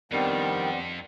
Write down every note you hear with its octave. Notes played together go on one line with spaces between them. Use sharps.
F2 D#3 G3 B3 C4 D4